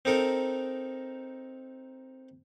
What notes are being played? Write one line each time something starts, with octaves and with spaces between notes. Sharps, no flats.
C4 D#4 A4 A#4